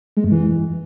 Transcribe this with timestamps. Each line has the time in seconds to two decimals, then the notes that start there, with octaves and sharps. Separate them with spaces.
0.17 G#3
0.24 F#2
0.32 E3